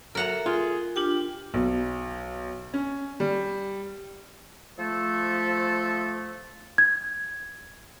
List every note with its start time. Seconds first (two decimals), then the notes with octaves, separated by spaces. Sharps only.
0.15 F#3 A4 A#4 E5 F#5 A#5
0.46 F4 G#4
0.96 D4 F4 G4 G5
1.54 B1
2.74 C#4
3.20 G3
4.78 F3 A3 A4
6.78 G#6